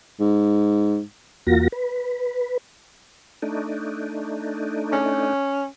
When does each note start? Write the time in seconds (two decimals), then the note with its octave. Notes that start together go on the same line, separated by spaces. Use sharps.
0.20 G#2
1.47 E2 A#3 F4 F#4 A#6
1.72 B4
3.42 A3 D4 D#4
4.92 C#4